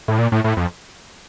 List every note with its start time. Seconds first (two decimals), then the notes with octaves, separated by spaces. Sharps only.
0.08 A2
0.18 A#2
0.32 A2
0.44 A2
0.57 F2